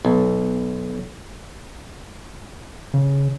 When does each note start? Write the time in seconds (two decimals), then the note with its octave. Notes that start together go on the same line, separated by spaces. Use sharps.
0.05 B1
2.94 C#3